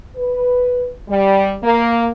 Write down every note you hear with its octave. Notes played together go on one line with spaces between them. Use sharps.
B4
G3
A#3